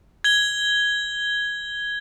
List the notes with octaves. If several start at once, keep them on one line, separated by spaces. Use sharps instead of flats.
G#6 G7